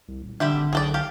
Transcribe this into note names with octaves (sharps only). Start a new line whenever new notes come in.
C2
D#1
D3 G3 G4 E5
G#1
B1 G#4 A4 D5
G4 F5